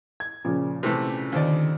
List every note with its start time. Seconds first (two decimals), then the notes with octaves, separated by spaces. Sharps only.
0.20 G#6
0.45 A#2 C#3 F3
0.83 C3 E3 A3
1.32 D#2 D3 D#3 C4 D5